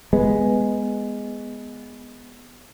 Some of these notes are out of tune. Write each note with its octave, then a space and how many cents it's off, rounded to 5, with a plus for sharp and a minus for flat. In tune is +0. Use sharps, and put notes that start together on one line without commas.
G#3 +0 B3 +0